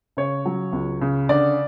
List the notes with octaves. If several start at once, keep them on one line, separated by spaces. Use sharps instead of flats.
C#3 C#5
F#3
C#2
C#3
D3 D5